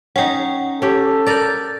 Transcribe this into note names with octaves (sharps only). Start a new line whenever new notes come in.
C#4 D#4 F#5 G5
C#4 G4 A4
A#4 D5 G6 A6